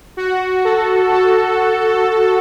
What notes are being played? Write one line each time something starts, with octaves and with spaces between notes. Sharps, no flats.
F#4
A4
A4